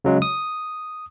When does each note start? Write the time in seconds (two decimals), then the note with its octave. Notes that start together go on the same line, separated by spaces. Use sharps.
0.05 C#3 F#3 G#3
0.22 D#6